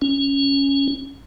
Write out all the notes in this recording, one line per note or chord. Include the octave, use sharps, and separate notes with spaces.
C#4